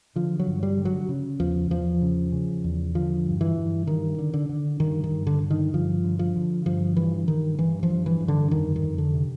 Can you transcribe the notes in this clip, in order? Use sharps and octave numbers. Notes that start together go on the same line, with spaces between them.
D3 F3
F#3
G2
G3
D3
F#3
C#3
E2 F3
E2 F3
C#3
C#3
E2
D3 F3
G2
E3
G2
G2 D#3
D3
D3
D3
G2 D#3
D#3
G2
D3
D3
D#3
G2 F3
D3
F3
D3
G2 F3
G2 E3
G2 D#3
G2 E3
F3
G2
E3
G2
D3
F2 D#3
D#3
F2
D3
C3